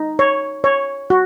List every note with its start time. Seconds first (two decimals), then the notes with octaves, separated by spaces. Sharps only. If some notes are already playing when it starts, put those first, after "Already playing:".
Already playing: D#4
0.19 C#5
0.64 C#5
1.10 F#4